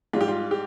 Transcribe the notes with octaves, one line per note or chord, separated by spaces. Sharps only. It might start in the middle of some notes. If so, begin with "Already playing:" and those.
G#2 G3 F4
G4
F4
G4